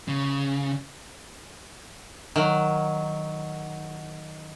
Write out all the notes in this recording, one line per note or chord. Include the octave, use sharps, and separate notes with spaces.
C#3
D#3 F#3